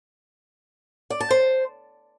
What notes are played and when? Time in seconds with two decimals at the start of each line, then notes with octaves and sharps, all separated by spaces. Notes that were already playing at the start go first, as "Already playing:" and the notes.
1.10 D5
1.20 A5
1.31 C5